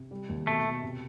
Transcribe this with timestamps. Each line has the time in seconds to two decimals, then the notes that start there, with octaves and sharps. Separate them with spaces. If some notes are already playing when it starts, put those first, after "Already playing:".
Already playing: C3
0.11 G3
0.29 D#2
0.47 B2 A3
0.65 B2
0.83 C3